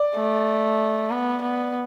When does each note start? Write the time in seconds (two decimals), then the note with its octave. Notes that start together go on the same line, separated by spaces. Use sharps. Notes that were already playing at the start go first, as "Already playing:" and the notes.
Already playing: D5
0.15 A3
1.10 B3
1.42 B3